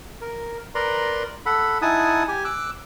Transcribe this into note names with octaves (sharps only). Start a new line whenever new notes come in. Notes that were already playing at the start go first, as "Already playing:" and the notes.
A#4
A#4 B4 D5 A#5 C6
A4 F#5 B5
D#4 E4 F#5 G#5 A5 D#6
G4 G#5
D6 E6 F#6